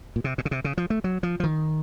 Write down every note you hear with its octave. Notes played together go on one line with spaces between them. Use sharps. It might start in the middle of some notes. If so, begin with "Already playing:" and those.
A#2
C3
A#2
C#3
C3
C#3
F3
A3
F#3
F3
F3
D#3